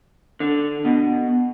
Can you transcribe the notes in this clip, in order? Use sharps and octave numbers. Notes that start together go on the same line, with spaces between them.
D3
B2